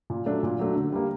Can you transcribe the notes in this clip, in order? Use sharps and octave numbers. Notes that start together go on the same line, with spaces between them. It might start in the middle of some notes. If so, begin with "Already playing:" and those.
A#2
F#3 A3 D4
A#2
F#3 A3 D4
D3
G3 A#3